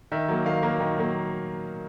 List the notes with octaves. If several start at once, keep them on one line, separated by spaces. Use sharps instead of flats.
D#3 E5
F#3 A#3
D#3 F5
F#3 A#3
D#3
F#3 A#3